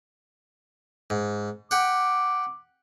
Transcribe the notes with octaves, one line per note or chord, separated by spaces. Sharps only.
G#2
G4 F#5 D6